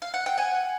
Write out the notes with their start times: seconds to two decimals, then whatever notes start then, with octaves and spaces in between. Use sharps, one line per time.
0.02 F5
0.14 F#5
0.26 G5
0.38 F#5 G#5